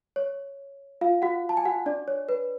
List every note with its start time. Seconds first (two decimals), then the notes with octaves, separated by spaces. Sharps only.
0.16 C#5
1.01 F4 F5
1.22 F#4 F#5
1.49 A5
1.57 G#5
1.65 F#4 F#5
1.86 D4 D5
2.08 C#5
2.29 B4